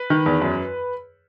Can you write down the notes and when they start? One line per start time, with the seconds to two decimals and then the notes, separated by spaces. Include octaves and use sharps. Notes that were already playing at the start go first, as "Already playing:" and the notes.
Already playing: B4
0.10 D#3
0.26 E2
0.42 F#2